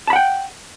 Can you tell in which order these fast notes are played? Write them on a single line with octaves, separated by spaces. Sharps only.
A5 B5 F#5 G5